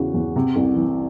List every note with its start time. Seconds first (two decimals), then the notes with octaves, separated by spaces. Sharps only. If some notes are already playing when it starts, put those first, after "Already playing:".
Already playing: E2 C#3 E3 F#4
0.14 E2
0.36 C3
0.56 C2
0.76 E3